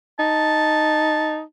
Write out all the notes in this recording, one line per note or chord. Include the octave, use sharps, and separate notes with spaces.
D#4 A5